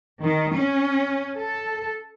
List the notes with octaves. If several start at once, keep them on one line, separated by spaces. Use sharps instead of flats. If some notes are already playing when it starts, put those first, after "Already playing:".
D#3
C#4
A4